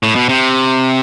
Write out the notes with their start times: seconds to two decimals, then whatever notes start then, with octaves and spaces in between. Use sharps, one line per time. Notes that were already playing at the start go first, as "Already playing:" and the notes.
0.03 A2
0.15 B2
0.29 C3